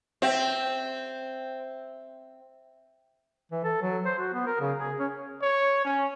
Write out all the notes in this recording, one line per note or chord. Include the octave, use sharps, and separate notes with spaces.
C4 E5 G5
E3
A4
F#3
C5
F#4
B3
A#4
C#3
G#4
C#4
C#5
C#4